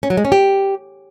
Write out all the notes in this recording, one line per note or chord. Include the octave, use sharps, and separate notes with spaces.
C#4
F#3
G#3
C#4
G4